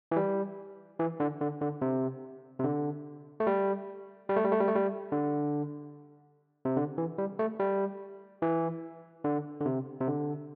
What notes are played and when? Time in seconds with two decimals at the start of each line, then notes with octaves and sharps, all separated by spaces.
0.11 E3
0.16 G3
0.99 E3
1.20 D3
1.41 D3
1.62 D3
1.82 C3
2.60 C3
2.64 D3
3.40 A3
3.47 G3
4.29 G3
4.36 A3
4.44 G3
4.52 A3
4.60 G3
4.68 A3
4.75 G3
5.12 D3
6.65 C3
6.77 D3
6.98 E3
7.18 G3
7.39 A3
7.59 G3
8.42 E3
9.24 D3
9.61 D3
9.66 C3
10.01 C3
10.07 D3